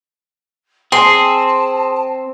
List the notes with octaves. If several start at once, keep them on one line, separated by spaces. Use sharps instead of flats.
C4 G#4 A5 C6